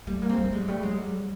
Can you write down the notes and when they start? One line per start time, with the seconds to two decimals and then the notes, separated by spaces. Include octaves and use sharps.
0.07 G3 A3
0.22 A#3
0.29 G#3 C4
0.38 A3
0.53 G3 G#3
0.61 F#3
0.68 G3 A3
0.83 F#3 G#3
0.98 G3